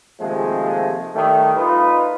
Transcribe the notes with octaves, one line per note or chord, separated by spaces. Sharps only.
D#2 C3 F3 G#3 A3
D#3 G3 A3
D#4 F4 B4